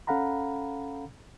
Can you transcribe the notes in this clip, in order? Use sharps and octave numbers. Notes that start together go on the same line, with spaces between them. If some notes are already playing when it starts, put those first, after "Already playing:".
C#4 A4 F5 F#5 A#5 B5